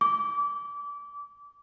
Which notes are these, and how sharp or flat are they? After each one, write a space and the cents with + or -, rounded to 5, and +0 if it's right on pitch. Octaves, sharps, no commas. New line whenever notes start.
D6 -25